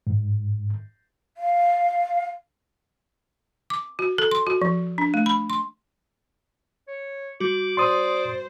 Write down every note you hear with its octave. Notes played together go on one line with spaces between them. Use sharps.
G#2
F5
D6
F#4
A4
C6
F#4
F3
D4
A3
B5
C6
C#5
G3 F#4 D6
C5 D5 C6 D#6